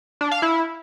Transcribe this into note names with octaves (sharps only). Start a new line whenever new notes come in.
D4
F5
E4